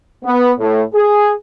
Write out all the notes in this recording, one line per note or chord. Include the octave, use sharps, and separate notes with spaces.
B3
A2
G#4